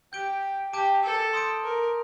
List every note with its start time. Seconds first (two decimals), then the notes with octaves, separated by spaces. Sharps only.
0.13 G4 G6 D7 G7
0.73 G4 A5 D6 G6 D7
1.04 A4
1.33 C6 D#6 G6 D7
1.64 A#4